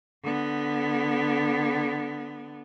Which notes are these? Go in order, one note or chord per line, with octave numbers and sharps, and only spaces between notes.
D3 B3